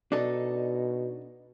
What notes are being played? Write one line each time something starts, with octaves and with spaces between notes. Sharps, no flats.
B2 D4 D#4 A4